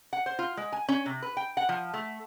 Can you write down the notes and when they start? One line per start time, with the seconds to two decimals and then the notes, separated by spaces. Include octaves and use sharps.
0.13 F#5
0.26 C5
0.39 F4
0.57 G#3
0.72 G#5
0.88 C#4
1.06 C3
1.22 B4
1.37 G5
1.57 F#5
1.69 F3
1.94 A3